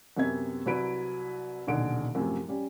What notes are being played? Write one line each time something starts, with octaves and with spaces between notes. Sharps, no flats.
F#2 C3 B3 E5 G#6
C2 F#3 E4 B4 B5 D7
D#1 B1 D3 G#4 D7
F#2 A2 C3 F3
G3 C#4 G4